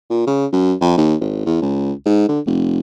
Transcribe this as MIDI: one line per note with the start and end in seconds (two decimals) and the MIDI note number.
0.10 0.25 46
0.27 0.46 49
0.52 0.73 42
0.81 0.96 41
0.97 1.15 39
1.21 1.45 32
1.46 1.59 40
1.62 1.92 37
2.06 2.28 44
2.29 2.40 50
2.47 2.80 29